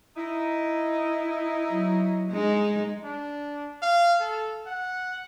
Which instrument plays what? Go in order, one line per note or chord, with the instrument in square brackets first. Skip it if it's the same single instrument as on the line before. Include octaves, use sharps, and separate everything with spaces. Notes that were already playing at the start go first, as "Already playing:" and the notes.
[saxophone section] D#4 E4
[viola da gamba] F#3
G#3 D#4
[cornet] D4
F5
A4
F#5